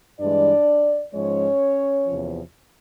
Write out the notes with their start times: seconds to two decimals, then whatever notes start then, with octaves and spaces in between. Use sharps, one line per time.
0.19 G2 E3 G#3 D4 D5
1.13 G#2 F3 G#3 C#4 C#5
2.07 E2 C3 F3